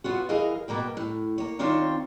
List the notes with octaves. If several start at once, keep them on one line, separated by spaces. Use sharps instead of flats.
B3 F4 F#4
E3 G#4 A#4 D#5 F5
B2 A#3 B4 G5
A2
A#3 C#5
D#3 C4 D4 F4 C5 C#5